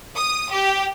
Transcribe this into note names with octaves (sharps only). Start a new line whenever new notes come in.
D#6
G4